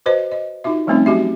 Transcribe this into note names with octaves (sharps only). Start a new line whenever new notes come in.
F#4 B4 C5 D#5
D#5
D#4 F4 F#4 E5
F3 G3 A3 C4 C#4 D#4
F#3 F#4 G4 E5